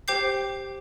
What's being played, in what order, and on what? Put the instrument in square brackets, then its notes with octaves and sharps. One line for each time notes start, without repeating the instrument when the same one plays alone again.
[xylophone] G4 C5 G5 D6 G6 C7